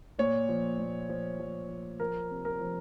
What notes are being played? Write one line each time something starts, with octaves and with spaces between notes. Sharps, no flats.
A#2 C#5
F3
A#2
F3
F3
F3
F3 A#4
C3
A#4
F3